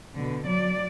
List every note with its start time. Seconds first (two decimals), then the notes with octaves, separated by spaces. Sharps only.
0.15 B2 D3
0.45 F#3 D5